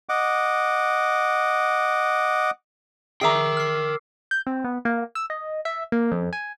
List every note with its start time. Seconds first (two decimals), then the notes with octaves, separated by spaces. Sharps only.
0.09 D#5 F#5 D6
3.21 G#4 A#4 E5 G5 A#5 D6 E6 C7
3.57 F6 C7
4.31 G6
4.47 C4
4.64 B3
4.85 A#3
5.15 E6
5.30 D#5
5.65 E5
5.92 A#3
6.12 F2
6.33 G#5